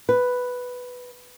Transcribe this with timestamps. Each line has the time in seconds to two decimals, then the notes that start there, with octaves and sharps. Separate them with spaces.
0.09 B4